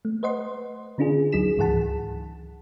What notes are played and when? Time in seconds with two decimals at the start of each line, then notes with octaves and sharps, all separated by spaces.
0.05 A3
0.23 B4 C5 D#5 F#5 C6
0.98 D3 C#4 D4 F4 G#4
1.32 D2 F#3 D#4 G#4 B6 E7
1.57 C#2 G#2 E3 G#4 F#5 A5